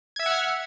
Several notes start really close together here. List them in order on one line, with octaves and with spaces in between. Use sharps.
G#6 E5 E6 F#5 F6